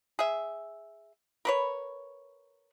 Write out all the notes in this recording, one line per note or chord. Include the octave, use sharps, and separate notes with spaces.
G#4 E5
A#4 B4 C#5